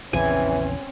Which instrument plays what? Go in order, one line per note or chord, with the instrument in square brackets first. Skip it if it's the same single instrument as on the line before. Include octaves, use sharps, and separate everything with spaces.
[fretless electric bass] A#1 E2 C#3 [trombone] E3 [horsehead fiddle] C4 C#4 [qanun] G#5